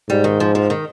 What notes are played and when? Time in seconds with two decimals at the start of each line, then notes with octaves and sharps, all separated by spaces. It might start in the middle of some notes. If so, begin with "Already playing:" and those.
0.09 G#2 G3
0.24 D#3
0.40 F3
0.55 F3
0.70 D#3